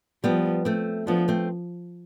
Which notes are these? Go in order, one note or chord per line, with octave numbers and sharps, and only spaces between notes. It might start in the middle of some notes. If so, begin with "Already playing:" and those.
F3 G3 B3
A3 C4
F3 B3 D4
A3 C4